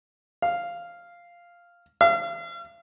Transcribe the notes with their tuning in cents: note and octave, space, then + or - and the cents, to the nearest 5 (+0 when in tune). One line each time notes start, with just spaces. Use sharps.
F5 -5
F5 -40